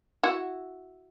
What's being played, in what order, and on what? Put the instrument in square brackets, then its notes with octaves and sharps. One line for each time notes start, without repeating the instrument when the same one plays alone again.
[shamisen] E4 F#4